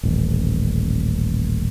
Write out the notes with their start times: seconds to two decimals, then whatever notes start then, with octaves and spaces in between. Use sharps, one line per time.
0.03 D#1 A1